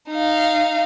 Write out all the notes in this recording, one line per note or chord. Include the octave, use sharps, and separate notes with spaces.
D#4 F5